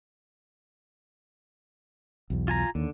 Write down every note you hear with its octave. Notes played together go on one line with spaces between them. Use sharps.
B1 E2
F4 G#5 A#5
D#2 D3